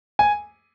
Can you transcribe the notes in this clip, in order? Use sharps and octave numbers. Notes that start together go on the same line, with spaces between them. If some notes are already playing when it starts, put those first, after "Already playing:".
G#5